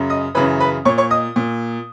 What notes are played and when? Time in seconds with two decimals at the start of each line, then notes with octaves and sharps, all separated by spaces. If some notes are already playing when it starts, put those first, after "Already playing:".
Already playing: F#2 C#3
0.10 D#5 D#6
0.35 F#2 C#3 E3 B4 B5
0.60 B4 B5
0.85 A#2 C#5 C#6
0.98 C#5 C#6
1.11 D#5 D#6
1.36 A#2